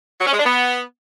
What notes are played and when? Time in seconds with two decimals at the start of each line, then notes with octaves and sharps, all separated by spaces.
0.21 F#3
0.27 C#4
0.33 G#3
0.39 D4
0.46 B3